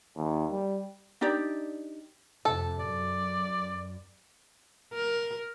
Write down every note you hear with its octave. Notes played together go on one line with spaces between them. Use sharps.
D#2
G3
D4 D#4 G4 D5
F2 C3 A4
F#2 D5
A#4